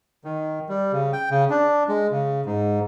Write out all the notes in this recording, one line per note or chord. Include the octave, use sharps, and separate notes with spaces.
D#3
G3
C#3
G5
C#3
D4
G#3
C#3
G#2